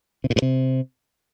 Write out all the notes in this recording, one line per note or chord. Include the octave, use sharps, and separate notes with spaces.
C3
A#2
G2
C3